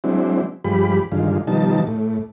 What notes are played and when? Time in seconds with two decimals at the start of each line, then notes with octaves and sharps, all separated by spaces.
0.04 F#3 G#3 C4 D4 E4
0.64 G2 F3 G#3 G4 B5
1.12 G2 D3 D#3 G#3 F4
1.47 B2 D#3 F3 G3 D#4 A5
1.87 A2